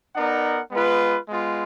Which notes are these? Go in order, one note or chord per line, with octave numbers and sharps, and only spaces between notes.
B3 D#4 A#4 D5 F#5
G#3 B3 F4 B4
G#3 B3 F4